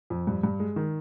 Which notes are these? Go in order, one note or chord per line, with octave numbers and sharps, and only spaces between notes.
F2
G2
G2
G#3
D#3